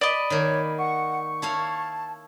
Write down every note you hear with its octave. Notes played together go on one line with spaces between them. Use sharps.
D5 D#5 B5
D#3 A#3 C#5
F#5 C#6
E4 C#5 F5 A5